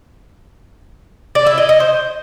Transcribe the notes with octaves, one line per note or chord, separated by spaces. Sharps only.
D5
E4
D#5
D#5
C5